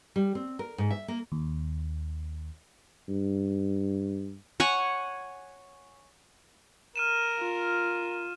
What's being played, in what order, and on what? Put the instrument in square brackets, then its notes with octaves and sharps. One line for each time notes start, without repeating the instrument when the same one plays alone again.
[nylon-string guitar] G3
C4
A#4
G#2
E5
A#3
[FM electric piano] D#2
[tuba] G2
[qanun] C#5 F#5 G#5 C#6
[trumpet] A#4 [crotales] F6 D#7 E7
[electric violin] F4